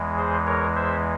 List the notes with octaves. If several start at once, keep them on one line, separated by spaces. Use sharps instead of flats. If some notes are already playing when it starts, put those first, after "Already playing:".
Already playing: E2 E3 G#3
G#4 C5
A#4 C#5
C5 E5